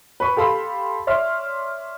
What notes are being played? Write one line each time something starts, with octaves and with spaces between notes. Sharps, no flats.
B4 B5 C#6
G4 A4 F5 B5 C6 E6
C#5 D5 E5 C6 F6